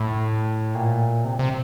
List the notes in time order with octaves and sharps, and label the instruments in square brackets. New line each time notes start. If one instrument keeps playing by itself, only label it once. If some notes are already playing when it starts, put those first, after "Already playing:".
Already playing: [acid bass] A2
A#2
C3
C3